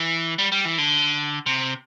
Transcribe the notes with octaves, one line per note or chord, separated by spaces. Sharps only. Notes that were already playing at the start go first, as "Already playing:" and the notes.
Already playing: E3
G3
G3
E3
D3
C3